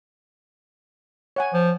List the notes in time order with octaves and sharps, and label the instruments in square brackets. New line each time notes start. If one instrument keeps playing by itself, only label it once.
[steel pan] C#5 F#5 G#5
[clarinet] F3